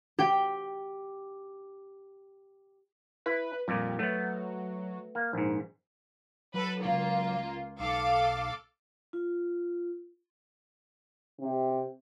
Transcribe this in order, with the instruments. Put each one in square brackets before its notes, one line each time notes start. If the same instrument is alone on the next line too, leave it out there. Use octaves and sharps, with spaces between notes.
[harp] G4 G5
[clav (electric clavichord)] E4 [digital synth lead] B4
[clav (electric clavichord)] F2 A#2 [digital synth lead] G3
[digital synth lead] F#3 [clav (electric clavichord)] A3 B3
[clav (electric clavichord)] A#3
A#1 G#2
[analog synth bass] F#3 [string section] A4 B4
[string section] C#2 A#3 F4
[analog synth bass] B1 [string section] A4 F5 D6
[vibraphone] F4
[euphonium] C3